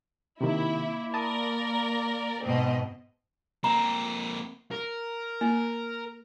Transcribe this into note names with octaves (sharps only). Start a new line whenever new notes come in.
C3 D#3 A#3 E4
A#4 D5 A5 B5 D#6
G#2 B2 C4 D#5
A#3 C4 A#5
A#4
A#3